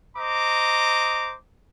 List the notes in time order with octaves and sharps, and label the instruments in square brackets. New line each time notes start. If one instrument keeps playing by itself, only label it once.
[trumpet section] C5 D#5 A#5 D6